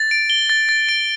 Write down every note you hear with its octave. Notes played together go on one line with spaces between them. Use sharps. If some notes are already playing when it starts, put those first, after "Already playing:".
Already playing: A6
D7
G7
A6
A6
D7